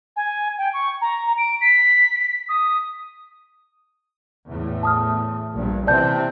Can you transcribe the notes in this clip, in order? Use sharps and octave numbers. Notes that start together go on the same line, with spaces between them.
G#5
G5
C#6
A#5
D7
B6
D#6
E2 A2
A5 D#6 F6
A#1 G2
C3 E3 C4 D5 A5 G6